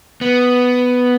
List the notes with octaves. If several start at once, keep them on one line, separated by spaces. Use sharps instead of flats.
B3